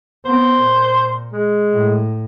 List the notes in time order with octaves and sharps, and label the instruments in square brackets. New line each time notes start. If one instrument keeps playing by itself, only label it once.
[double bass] B3 [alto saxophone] C5
[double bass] A#2
[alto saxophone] G#3
[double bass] A2